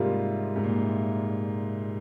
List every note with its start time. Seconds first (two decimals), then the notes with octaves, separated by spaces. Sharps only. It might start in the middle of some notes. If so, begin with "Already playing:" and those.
Already playing: G#2 C3 G3 A#3 F4
0.56 G#2
0.64 A#2